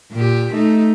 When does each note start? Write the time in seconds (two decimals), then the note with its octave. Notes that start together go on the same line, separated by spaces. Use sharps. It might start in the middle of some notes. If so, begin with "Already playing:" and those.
0.12 A#2 G4
0.53 A3 D#4